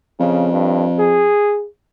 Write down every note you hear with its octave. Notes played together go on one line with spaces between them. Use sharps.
F2 C#3
G2
G#4